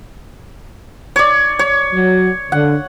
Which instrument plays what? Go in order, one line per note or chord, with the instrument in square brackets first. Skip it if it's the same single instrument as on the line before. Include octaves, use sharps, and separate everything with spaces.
[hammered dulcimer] C#5 D5
C#5
[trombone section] F#3
[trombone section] D3 [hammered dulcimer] F#5